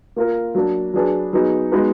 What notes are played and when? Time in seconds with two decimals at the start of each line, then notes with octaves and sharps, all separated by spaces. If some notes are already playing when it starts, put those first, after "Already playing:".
0.16 A#3 F4 A#4
0.55 F#3 A#3 D4
0.94 F#3 D4 G#4 B4
1.33 F#3 B3 D#4 G#4
1.72 G#3 B3 D#4 F#4 B4